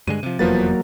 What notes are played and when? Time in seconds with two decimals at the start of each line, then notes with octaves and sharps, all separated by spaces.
0.07 G2 D3 G#3 D#7
0.23 C3 F3
0.39 F1 E2 F3 F#3 A#3 B4 A6